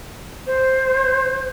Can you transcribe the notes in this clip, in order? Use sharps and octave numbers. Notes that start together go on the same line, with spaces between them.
C5